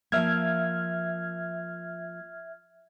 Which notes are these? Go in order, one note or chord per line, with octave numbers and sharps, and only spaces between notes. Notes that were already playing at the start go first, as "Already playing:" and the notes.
F3 A#3 E5 F6 G#6